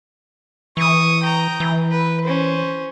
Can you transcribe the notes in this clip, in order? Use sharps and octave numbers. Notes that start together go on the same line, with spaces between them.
E3 C#6 D#6
G5 A#5
E3
B4
C#4 C5